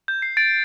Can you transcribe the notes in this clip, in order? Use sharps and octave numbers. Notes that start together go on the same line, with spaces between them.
G6
C7
A6 D7